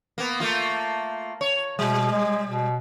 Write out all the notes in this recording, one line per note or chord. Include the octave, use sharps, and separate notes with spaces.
A#3 B3
A3 A#3 F4
C#5
B2 G3
G#3
B2